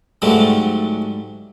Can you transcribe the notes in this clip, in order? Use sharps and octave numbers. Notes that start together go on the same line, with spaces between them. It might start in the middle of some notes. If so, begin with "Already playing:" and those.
G#2 D3 F#3 G3 A3